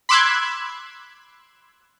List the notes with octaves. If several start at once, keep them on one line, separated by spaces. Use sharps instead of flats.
B5 C6 D6 E6 F#6 G#6